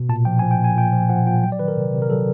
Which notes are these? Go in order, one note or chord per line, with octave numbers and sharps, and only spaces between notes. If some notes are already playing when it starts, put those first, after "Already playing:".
Already playing: B2
A#2 A5
F3 G5
F3 G#5
G5
A#2
G#5
A#2 G5
F3
F3 F#5
A#2 G5
F#3 G5
D5
D#3 B4
A#4
C3
C3
A#4
F#3 A4